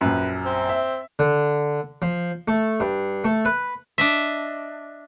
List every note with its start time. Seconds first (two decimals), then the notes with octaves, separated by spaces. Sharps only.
0.01 A#1 F#2 B4
0.45 C4
0.69 E5
1.19 D3
2.02 F3
2.48 A3
2.80 G2
3.24 A3
3.45 B4
3.98 D4 D#5 E5